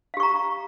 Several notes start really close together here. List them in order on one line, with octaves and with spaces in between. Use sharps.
F5 G4 C#6 A#5